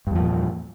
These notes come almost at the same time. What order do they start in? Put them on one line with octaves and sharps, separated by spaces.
G2 E2 F3 A#2